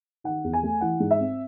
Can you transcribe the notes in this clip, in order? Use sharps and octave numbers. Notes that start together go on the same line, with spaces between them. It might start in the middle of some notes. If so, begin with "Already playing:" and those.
D#3 F#5
E2
G#5
A3
E3 F#5
G#2
E5
C4